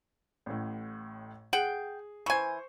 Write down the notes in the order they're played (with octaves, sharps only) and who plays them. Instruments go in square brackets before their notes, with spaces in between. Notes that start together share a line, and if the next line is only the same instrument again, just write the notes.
[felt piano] A1 A2
[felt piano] G#4 [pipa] F#5 G5
[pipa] E3 G#5 [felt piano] C5 C#6